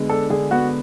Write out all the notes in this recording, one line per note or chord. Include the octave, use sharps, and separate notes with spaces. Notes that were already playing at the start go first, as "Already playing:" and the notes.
Already playing: D3 G#3 B3
D4 A4
D3 G#4
B3 F#4